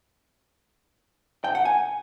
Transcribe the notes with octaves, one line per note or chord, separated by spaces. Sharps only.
G5
F#5
G#5